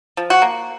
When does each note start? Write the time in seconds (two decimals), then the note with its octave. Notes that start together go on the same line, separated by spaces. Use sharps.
0.17 F3
0.30 F#4
0.42 A#3